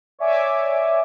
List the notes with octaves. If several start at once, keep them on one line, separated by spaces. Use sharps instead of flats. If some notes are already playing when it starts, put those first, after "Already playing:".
C#5 D5 E5 G#5 D6